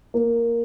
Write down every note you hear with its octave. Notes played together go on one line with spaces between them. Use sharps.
A#3